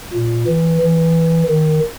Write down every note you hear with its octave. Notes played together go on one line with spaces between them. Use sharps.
A#2
E3
E3
D#3